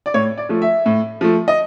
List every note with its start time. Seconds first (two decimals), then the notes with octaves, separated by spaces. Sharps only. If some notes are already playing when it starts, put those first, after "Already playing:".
0.06 D5
0.14 A2 C#5
0.38 D5
0.49 F3 A3
0.62 E5
0.86 A2
1.21 F3 A3
1.48 D#5